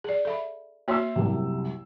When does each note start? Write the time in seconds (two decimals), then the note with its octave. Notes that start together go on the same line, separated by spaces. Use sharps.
0.04 G#4 D5
0.25 A4 E5 B5
0.88 A#3 F#4 C#5 E5 C6 E6
1.16 C2 F#2 C3